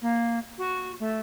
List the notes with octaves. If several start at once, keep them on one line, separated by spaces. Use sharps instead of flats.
A#3
F#4
A3